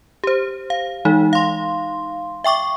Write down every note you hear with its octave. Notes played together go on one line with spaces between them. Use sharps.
G4 C5
F5
E3 G#3 D#4
F5 C6
E5 G5 C#6 D6